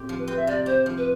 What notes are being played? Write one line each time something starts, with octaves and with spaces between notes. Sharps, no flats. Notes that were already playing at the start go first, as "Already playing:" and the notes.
Already playing: A2 C4 G4
F3
B4
C4
E5
C3 D5
G4 C5
F3
B4